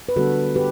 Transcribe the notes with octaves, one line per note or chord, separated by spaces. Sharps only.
B4
D3 G3 B3 D4 F#4 A4
G4 B4